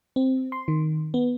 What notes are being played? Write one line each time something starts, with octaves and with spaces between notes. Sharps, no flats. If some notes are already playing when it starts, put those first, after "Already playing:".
C4
C6
D#3
B3